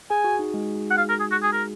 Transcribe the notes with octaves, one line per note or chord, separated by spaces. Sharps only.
G#4 G#5
F#4
D#4
G#3
F#5
F5
A#4
G#4
F#4
G#4
A#4